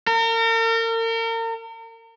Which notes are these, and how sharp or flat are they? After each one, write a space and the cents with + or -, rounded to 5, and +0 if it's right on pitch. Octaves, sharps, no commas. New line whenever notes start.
A#4 -40